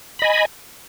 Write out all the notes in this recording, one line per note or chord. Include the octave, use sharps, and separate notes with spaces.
D#5 G#5 B5